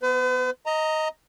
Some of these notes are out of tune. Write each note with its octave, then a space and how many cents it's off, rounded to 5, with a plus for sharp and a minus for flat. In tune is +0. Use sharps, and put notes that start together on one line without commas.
B3 +0 B4 +45
D#5 +10 A#5 -15